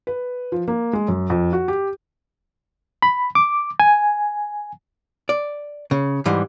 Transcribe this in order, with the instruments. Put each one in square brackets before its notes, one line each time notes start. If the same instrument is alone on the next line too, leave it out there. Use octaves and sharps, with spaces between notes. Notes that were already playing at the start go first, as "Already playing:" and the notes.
[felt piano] B4
F3
A#3
G#3
F#2
F2
F#4
G4
[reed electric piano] B5
D6
G#5
[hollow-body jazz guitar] D5
C#3
G#2 E3 G3